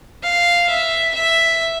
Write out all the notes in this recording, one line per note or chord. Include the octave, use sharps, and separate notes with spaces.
F5
E5
E5